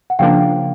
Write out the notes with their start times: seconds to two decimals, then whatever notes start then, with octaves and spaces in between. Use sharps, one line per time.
0.10 F#5
0.19 C#3 F3 A#3 D4 F5 G5